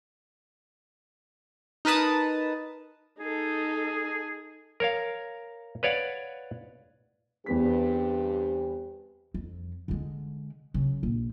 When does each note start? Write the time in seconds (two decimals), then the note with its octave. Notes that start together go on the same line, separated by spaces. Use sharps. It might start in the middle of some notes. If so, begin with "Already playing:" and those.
1.85 D#4 A#4 B4 A5 D#6
3.19 D#4 G#4 A4
4.80 A#4 C#5 F5
5.83 B4 C#5 D5 F5 F#5
7.46 E2 G2 B3 C4 G4 B6
9.34 F2
9.88 D3 G#3
10.74 C#3 F#3
11.03 A#1